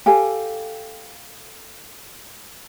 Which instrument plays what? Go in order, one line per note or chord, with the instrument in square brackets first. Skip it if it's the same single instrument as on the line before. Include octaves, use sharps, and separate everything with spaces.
[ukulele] G4 A4 F5 G#5